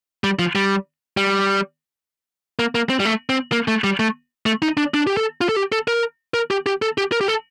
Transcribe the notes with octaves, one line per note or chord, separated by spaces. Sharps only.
G3
F3
G3
G3
A#3
A#3
C4
G3
A3
C4
A#3
A3
G3
A3
A3
D#4
D4
D4
G4
A4
F4
A4
G4
A4
A#4
A#4
G4
G4
A4
G4
A#4
G4
A4